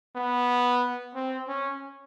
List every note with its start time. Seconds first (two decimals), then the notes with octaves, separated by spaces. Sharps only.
0.16 B3
1.15 C4
1.48 C#4